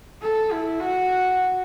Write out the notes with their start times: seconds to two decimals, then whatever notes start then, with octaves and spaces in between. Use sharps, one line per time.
0.22 A4
0.52 E4
0.80 F#4